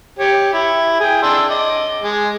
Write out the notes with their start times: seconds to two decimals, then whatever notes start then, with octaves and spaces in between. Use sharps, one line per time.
0.19 G4 C#5
0.53 E4
1.00 G#4 G5
1.22 D4 C6 E6
1.50 D#5 D6
2.03 G#3